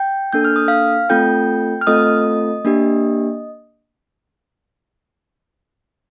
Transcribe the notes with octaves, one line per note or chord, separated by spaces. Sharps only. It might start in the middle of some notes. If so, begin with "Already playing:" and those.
Already playing: G5 G6
A#3 D4 A4 G6
F6
D#6
F5 F6
A3 C4 F4 A4 G5 G6
F6
A3 C4 F4 A4 D#5 D#6
A#3 D4 G4